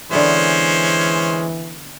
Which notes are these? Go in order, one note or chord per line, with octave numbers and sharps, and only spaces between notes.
D3 E3 G#3 B3 C#4 C5 E5